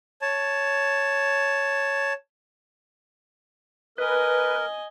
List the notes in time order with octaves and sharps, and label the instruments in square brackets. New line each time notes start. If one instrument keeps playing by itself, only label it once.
[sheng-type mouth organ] C#5 A5
[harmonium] A#4 [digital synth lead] B4 [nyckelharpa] D#5 G#5